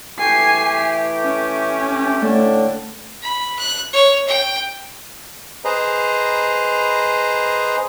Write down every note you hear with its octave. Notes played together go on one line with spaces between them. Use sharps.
E3 A3 G4 G#5 C7
C#4
A2 D3 A3 D4
B5
F#6
C#5
G5
G#4 B4 C5 D#5 A#5